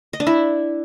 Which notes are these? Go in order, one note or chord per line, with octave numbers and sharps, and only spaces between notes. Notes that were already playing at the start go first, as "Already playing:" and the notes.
D#5
D4
E4